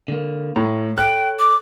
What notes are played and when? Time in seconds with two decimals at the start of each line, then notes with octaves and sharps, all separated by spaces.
0.08 D3 A#3
0.56 A2 A3 A#5
0.98 A4 C#5 G5 F#6
1.39 D6